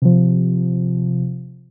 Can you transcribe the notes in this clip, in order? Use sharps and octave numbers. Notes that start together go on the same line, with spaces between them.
C3 F3